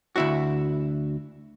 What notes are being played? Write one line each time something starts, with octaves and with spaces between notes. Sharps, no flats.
D2 E4 F#4